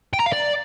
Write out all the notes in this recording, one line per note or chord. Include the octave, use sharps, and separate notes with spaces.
G5
A#5
F5
D5